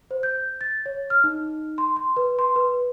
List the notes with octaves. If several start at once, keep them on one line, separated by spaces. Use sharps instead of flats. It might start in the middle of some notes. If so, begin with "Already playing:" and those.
C5
G6
A6
C#5
F6
D#4
C6
C6
B4
C6
B4